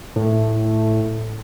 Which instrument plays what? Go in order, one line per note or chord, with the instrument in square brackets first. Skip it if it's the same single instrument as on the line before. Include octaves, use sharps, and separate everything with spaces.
[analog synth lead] A2